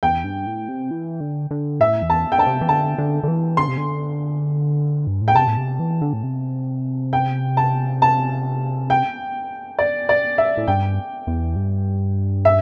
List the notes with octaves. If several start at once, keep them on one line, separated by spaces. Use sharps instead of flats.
E2 G5
G2
A2
C3
E3
D3
D3
A2 E5
E2
A5
G5
D3 A5
C3
E3
D3 A5
D3
D3
E3
D3 C6
C3
D3
G2
A2
G5
C3 A5
A2
C3
E3
D3
A2
C3
G5
A5
A5
G5
D5
D5
E5
A2
G2 G5
E2
G2
E5